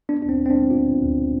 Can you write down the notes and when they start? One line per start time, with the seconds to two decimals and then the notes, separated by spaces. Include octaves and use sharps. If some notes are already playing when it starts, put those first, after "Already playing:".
0.09 B3 D4
0.22 D4
0.25 D2 C4
0.40 D2
0.46 C4
0.50 D4
0.55 G#3
0.70 B3 F4
0.86 B3
1.02 D2